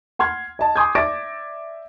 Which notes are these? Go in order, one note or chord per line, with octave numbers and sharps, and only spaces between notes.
F#5 C6 F6 G#6
D#5 A5
G#5 C6 D6 D#6 G6 G#6
D5 E5 D6 A6 A#6 D7